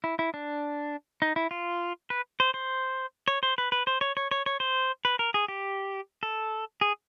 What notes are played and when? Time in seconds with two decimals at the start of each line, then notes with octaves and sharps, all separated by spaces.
0.04 E4
0.19 E4
0.34 D4
1.22 D#4
1.36 E4
1.51 F4
2.10 B4
2.40 C5
2.54 C5
3.28 C#5
3.43 C5
3.58 B4
3.72 B4
3.87 C5
4.01 C#5
4.17 C#5
4.31 C#5
4.46 C#5
4.60 C5
5.05 B4
5.19 A#4
5.34 G#4
5.48 G4
6.23 A4
6.81 G#4